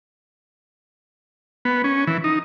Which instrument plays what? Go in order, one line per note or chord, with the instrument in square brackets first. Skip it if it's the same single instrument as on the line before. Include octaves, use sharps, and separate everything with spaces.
[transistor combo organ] B3
C#4
E3
D#4